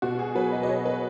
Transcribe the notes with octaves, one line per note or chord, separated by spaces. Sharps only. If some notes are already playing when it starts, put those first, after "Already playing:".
B2 F#4
G#4
F#3 B4
D#5
D#5
F#3 C#5
B4